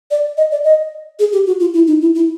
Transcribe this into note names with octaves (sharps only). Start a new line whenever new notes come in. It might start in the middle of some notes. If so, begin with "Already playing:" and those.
D5
D#5
D5
D#5
G#4
G4
F#4
F4
E4
D#4
E4
E4